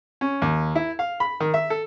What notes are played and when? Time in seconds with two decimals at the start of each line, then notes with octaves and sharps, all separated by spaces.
0.21 C#4
0.42 D#2
0.75 E4
0.99 F5
1.20 B5
1.40 D#3
1.54 E5
1.70 A4